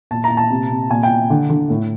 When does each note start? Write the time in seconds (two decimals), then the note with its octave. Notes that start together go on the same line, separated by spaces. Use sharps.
0.11 A#2 A5
0.24 A#5
0.31 A#2
0.37 A5
0.50 C3
0.70 C3
0.90 A#2 G#5
1.03 G5
1.10 A#2
1.30 D3
1.50 D3
1.70 A2